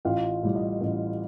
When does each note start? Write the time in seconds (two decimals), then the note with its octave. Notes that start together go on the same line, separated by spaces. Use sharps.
0.05 A1 F4 F5
0.43 A2 G3
0.55 D#5
0.81 A1